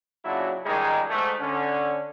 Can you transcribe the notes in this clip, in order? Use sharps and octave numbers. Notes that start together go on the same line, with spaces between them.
A#2 C#3 F#3 D4 E4 F#4
C#2 D#3 G3 G#3 D#4 G#4
G#2 A3
D3 C#4